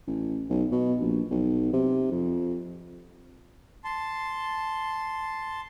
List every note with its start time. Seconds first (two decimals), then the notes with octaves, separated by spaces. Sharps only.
0.07 A1
0.49 B1
0.71 B2
1.01 A#1
1.31 B1
1.73 C3
2.12 F2
3.84 A5 C6